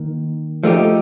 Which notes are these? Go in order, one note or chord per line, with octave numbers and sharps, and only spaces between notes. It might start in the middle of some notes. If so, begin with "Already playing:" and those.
Already playing: D#3 A#3
F3 A3 D#4 G4